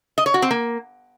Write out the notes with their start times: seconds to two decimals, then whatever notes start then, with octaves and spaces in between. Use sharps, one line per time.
0.18 D#5
0.26 C#5
0.34 F#4
0.42 C4
0.51 A#3